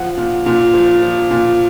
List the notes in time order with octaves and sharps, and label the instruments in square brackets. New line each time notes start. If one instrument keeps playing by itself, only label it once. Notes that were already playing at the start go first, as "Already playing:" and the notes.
Already playing: [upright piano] F3 F#5
A#2
A#2
F3
F3
A#2